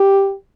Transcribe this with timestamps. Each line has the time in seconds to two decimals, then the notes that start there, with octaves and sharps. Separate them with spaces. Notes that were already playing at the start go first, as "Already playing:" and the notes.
Already playing: G4